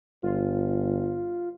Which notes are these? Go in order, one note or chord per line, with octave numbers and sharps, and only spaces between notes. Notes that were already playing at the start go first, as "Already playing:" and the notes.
G1 F4